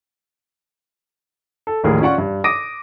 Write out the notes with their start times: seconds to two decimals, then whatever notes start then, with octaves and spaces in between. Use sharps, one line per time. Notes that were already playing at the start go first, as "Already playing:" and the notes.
1.67 A4
1.84 A#1 D#2 A2 G#4 A#4
2.01 C#4 F4 D5 F#5 C#6
2.18 G2
2.44 D6 D#6 A#6 D7 D#7